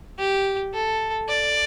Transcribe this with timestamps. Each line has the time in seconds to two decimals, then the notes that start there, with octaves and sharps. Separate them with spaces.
0.18 G4
0.74 A4
1.29 D5